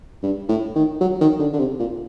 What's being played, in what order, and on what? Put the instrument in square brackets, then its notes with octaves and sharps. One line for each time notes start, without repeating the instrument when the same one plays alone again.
[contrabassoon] G2
A2
D#3
F#3
D#3
D3
D3
C3
A#2